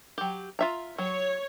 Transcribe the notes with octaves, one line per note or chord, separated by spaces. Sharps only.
F#3 G4
F4 E5 A#5
F#3 C#5